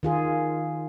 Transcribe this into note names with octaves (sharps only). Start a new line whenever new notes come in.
D#3 F4 G#4